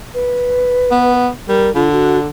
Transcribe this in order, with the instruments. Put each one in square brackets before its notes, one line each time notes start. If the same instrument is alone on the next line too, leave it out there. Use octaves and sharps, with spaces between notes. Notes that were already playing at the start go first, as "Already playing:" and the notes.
[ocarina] B4
[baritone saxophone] B3
[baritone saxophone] G3 [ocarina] A#4
[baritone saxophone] D3 [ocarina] F4
[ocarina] F#4